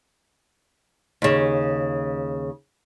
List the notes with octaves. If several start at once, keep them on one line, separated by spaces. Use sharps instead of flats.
D#2 C#3